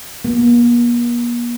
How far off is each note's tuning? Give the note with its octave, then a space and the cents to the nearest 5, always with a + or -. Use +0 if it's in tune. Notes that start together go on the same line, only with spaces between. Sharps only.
A#3 +45